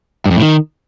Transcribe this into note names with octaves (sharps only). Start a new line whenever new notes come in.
G2
F2
A2
D#3